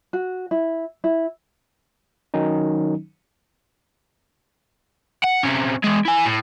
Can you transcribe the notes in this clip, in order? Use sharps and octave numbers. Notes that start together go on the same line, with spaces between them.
F#4
E4
E4
D#3 F#3 C#4 D#4
F#5
C3 C#4
E3 G#3
E4 G#5
A2